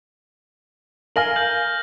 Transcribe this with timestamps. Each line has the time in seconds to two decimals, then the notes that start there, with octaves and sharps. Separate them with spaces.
1.16 A#4 F5 G#5 F6 A#6 F#7
1.36 G6 F#7